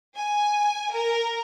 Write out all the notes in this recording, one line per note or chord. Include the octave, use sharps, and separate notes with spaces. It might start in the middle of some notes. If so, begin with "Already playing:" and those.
G#5
A#4